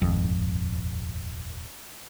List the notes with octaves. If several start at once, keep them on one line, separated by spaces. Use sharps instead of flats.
D#1 G#1 F2